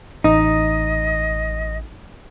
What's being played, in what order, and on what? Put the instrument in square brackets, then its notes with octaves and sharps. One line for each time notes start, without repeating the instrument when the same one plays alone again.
[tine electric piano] A1 D#6 [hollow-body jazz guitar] D#4 [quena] D#5